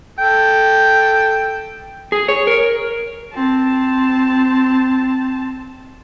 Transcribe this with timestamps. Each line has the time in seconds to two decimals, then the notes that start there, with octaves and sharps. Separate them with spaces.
0.19 A4 G5
2.12 G#4
2.28 C#5
2.47 A#4
3.34 C4 A5